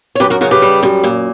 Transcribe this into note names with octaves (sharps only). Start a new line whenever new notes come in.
C#5
F#2 G4 B4
F#4 A#4
C#3 F#4 A#4
G4 B4
G3
F#2
A#2